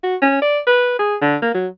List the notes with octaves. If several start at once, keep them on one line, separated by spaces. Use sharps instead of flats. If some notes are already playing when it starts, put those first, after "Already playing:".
F#4
C#4
D5
B4
G#4
D3
A#3
F#3